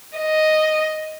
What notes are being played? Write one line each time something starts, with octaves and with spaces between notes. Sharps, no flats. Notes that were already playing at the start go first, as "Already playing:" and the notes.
D#5